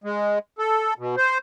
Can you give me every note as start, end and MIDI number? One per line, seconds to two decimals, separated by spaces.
0.04 0.39 56
0.59 0.94 69
0.99 1.16 47
1.17 1.38 72